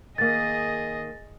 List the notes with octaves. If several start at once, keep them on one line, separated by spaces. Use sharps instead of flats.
D#3 A#3 G#4 D#5 A6